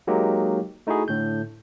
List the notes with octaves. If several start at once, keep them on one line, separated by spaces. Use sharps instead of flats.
F#3 G#3 A#3 D#4 G4
A3 D#4 E4 F#4 G#4
A2 D3 G6